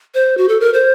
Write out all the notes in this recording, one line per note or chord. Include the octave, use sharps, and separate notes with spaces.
C5
F#4
A4
A#4
C5